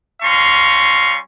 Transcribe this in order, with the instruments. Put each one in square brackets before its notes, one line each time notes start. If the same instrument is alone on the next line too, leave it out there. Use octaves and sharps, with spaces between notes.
[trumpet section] G3 C#4 F5 A#5 C6 C#6